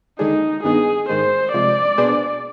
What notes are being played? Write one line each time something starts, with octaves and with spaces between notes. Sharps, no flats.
D#2 D3 G#3 D4 D#4 G#4
G2 D#3 B3 D#4 G#4
G#2 D#3 G#3 C5
C3 F3 G#3 D5
B2 B3 D4 G#4 C5